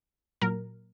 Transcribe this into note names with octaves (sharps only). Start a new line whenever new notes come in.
A#2 F#3 A#4